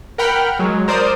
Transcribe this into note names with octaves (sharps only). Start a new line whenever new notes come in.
A#4 F#5 G5 B5 F6
F#3 G#3
A#4 C5 D5 D#6 G6